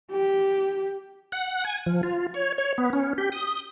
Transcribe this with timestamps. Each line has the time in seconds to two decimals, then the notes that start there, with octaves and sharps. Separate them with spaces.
0.11 G4
1.32 F#5
1.65 G#5
1.86 F3
2.03 F4
2.34 C#5
2.58 C#5
2.78 B3
2.93 C#4
3.18 G4
3.32 D#6